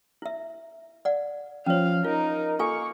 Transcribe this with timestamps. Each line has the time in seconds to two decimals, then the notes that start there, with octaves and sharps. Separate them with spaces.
0.22 E4 E5
1.05 D5 F#5
1.66 F3 C#4 C#5 F5
2.04 D#4 F4 A#4
2.59 A#3 F4 A4 G#5 C#6